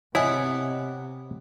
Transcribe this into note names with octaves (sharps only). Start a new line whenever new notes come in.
C3 B3 E4 C#5 D#5 G#5